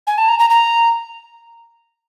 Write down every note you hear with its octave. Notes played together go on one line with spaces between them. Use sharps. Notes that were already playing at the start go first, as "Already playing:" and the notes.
G#5
A5
A#5
A#5
A#5